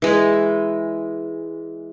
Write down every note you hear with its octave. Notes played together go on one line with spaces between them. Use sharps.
E3 G#3